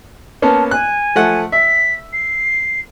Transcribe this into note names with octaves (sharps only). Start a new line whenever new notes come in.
A#3 B3 C#4 A5
G#5 F#6
F3 A3 F#5
E5 B6
C7